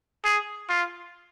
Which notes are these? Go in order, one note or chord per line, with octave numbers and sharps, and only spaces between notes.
G#4
F4